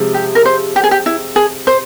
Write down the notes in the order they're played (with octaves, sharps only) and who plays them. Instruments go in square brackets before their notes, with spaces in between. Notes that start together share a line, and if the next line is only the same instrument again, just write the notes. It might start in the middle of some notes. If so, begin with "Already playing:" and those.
Already playing: [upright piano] C3 F3 G#3
[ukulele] G4
A#4
C5
G4
G#4
G4
E4
G#4
C5